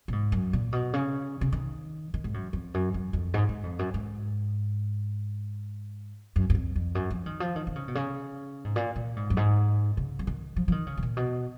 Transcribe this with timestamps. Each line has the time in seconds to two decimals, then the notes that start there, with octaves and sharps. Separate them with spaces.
0.08 A#2
0.12 G#2
0.32 F#2
0.53 A#2
0.73 B2
0.93 C#3
1.41 C#3
1.53 D#3
2.14 D#3
2.24 G#2
2.34 F#2
2.53 F2
2.74 F#2
2.94 F#2
3.13 F2
3.34 G#2
3.49 G#2
3.63 F2
3.79 F#2
3.94 G#2
6.36 F#2
6.50 F#2
6.55 F2
6.76 F2
6.95 F#2
7.10 F3
7.26 D#3
7.40 F3
7.56 D#3
7.67 D#3
7.76 C#3
7.88 B2
7.95 C#3
8.65 G#2
8.76 A#2
8.96 A#2
9.16 G#2
9.30 F#2
9.37 G#2
9.97 C#3
10.19 F3
10.27 D#3
10.56 F3
10.68 F3
10.72 D#3
10.87 C#3
10.97 G#2
11.03 A#2
11.17 B2